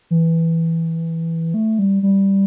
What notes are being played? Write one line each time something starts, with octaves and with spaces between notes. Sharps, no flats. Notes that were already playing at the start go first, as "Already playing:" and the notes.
E3
A3
G3
G3